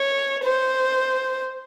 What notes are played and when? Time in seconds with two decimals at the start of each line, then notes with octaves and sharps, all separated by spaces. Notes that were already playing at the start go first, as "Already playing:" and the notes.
Already playing: C#5
0.43 C5